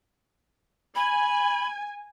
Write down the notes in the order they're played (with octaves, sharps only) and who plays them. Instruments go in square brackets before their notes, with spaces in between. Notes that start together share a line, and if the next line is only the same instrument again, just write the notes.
[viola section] G#5 [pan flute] B5